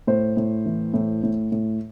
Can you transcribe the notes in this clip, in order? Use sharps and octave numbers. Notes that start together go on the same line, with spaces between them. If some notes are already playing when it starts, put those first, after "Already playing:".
A2 C5
A2
E3
A2
A2
A2